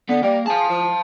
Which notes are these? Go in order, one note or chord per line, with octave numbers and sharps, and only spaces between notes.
D3 B3
G3 A#3
G#4 F5 A5
F3